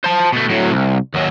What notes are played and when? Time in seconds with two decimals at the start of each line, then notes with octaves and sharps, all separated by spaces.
0.04 C5 A5
0.32 B2 A3
0.50 A2 F#3
0.71 C2
1.14 D#2 F#3